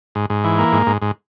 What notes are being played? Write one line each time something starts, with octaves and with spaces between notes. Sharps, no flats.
G#2
G#2
E3
A#3
G#2
G#2
G#2